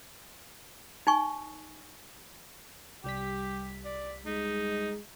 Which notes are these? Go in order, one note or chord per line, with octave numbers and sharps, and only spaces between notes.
D#4 G#5 C#6
C2 G3 G4 B6
D5
G#3 D#4